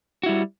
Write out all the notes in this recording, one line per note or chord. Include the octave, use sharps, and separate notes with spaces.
G3 E4 F#4